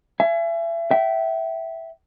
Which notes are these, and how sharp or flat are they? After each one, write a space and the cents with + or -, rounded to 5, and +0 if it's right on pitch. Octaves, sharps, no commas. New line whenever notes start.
E5 +35 G#5 +10
E5 +0 G5 -30